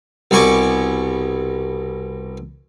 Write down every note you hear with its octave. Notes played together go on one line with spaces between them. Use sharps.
C2 B2 G#5 C#6 D6